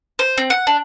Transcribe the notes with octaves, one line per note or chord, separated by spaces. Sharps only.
C5
C4
F#5
D4